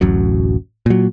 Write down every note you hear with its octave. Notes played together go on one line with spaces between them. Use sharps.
D1 A1 F#2 F#3
A#2 F#3